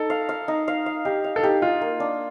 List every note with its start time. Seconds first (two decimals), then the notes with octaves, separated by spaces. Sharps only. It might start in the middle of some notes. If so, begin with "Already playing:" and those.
Already playing: D#4 A4
0.10 F5
0.29 F5
0.48 D#4
0.68 F5
0.86 F5
1.05 D#4 G4
1.24 F5
1.36 A4
1.43 D#4 G4
1.62 D#4 F4
1.81 A#3
2.00 D4